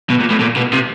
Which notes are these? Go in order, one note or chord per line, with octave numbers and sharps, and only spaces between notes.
B2
A#2
A2
A#2
B2
C3